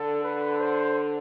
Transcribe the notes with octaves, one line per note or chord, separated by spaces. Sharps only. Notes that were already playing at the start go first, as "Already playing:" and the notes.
Already playing: D3 A4
B4
C5